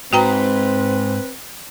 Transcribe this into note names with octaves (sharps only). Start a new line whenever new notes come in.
G#2 C4 F#4 B4 G5 A#5